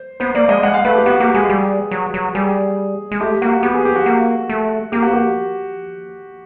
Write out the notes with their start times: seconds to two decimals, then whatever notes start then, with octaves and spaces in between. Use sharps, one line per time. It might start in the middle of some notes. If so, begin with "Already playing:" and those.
Already playing: C5
0.20 B3 C5
0.35 A#3 D5
0.49 G#3 D#5
0.63 G#3 F#5
0.74 F5
0.85 A3 B4
0.95 G4
1.06 B3 F#4
1.20 A#3 G4
1.34 G#3 G#4
1.50 G3
1.91 F#3
2.14 F#3
2.35 G3 G#4
3.11 G#3
3.20 A3 G4
3.42 A#3 F#4
3.63 B3 G4
3.74 G#4
3.85 G4
3.95 F#4
4.06 A#3
4.49 A3
4.92 A#3 G4
5.02 F#4
5.07 B3
5.13 A#3 G4